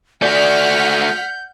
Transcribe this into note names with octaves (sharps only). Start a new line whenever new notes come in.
A3 F#4 D5 F#5 F6 G6 B6